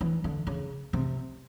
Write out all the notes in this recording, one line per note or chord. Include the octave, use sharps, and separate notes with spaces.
E3
D3
C#3
C3